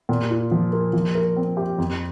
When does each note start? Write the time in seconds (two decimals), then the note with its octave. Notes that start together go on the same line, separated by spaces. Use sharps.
0.09 A#2
0.30 F4
0.51 F3
0.73 A#3
0.93 F3
1.15 A#4
1.37 C4
1.57 G4
1.78 F2